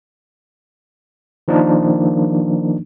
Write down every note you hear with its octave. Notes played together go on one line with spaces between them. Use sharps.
D#3 F3 A#3 D4 D#4